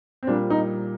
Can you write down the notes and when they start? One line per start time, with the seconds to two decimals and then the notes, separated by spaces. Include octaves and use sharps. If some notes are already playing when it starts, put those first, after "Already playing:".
0.23 C4
0.27 A#2 G3 A#3 D4
0.50 D#4